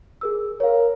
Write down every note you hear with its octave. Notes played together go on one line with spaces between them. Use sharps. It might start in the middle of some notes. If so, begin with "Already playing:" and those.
G#4 A#4 E6
A#4 C#5 F5